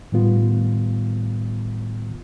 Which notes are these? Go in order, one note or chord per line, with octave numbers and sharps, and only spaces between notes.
A2 D#3 G3 B3 F4